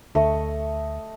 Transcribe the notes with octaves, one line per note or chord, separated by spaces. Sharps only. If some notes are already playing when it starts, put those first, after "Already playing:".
D2 A3 D#5 C#6